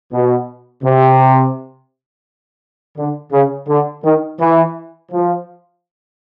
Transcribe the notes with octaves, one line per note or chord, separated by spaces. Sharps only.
B2
C3
D3
C#3
D3
D#3
E3
F3